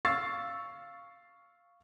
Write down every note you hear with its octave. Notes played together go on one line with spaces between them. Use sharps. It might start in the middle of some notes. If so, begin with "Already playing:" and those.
F5 C#6 E6 A6 C7